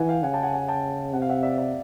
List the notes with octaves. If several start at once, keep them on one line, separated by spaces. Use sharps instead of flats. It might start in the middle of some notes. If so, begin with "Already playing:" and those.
Already playing: E3 F#5 G#5
F5 G5
C#3 F#5 G#5
G5 A5
F#5 G#5
F#5 G#5
G5 A5
C3 F#5
F5
E5 F#5
D5 E5
D5 E5